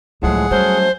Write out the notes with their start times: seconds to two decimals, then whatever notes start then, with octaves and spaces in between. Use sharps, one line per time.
0.23 C#2 A2 F3 F#3 G#3 G#4 F#5
0.51 F#3 G3 A3 C#4 C5